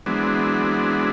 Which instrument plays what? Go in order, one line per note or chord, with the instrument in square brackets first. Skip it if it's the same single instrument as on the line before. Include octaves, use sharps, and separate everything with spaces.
[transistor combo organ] E3 F#3 G#3 B3 C4 D4